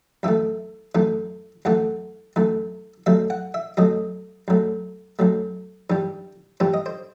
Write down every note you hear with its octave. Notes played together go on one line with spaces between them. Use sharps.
F#2 E3 A3 E5
F#2 E3 A3
F#2 E3 A3 F#5
F#2 E3 A3
F#2 F#3 A3 E5
F#5
E5
F#2 F#3 A3 D#5
F#2 F#3 A3
F#2 F#3 A3
G2 E3 G3
G2 E3 G3 C5
D#5
C5